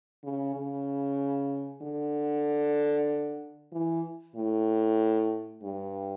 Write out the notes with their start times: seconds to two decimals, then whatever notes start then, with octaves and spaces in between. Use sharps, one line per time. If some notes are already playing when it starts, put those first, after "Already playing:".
0.24 C#3
0.56 C#3
1.82 D3
3.72 E3
4.36 A2
5.63 G2